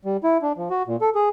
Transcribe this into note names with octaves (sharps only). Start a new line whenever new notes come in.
G3
E4
D4
F3
F#4
A#2
A4
G#4